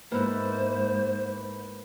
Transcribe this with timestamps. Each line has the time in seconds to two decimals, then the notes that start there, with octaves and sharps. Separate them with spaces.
0.12 G#2 A#3 B3 E4 B4 C5